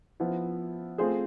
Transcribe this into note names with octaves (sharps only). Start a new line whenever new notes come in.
F3 B3 E4
A3 C4 F4 G#4 C5